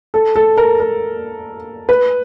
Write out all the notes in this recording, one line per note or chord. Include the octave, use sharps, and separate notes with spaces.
A4
A4
A#4
A#4
B4